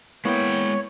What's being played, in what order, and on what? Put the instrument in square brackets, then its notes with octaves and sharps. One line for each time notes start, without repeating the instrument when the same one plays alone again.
[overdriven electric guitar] G#3 G5 [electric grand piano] A#3 B3 E4 [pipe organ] C#5